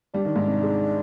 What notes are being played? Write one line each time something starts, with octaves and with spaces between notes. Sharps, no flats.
G3 D4
D#3
G#2
C3
G#3